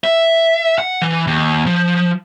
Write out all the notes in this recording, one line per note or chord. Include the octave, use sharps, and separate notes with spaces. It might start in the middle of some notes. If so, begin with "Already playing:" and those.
E5
F#5
E3
D#2
F3